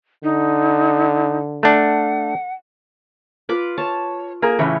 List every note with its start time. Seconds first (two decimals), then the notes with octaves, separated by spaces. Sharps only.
0.24 D3 D#4
1.63 A3 D4 F#5
3.49 F4 B4 D6
3.78 C#5 A5
4.42 A#3 G#4 A#4
4.59 A2 C#3 E3 C#5